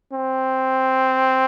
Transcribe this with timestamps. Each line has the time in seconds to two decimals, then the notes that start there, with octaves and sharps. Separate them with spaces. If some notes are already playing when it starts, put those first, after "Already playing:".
0.12 C4